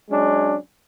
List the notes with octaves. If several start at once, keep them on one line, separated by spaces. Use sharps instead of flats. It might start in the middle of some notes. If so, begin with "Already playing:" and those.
F#3 G#3 C#4 D4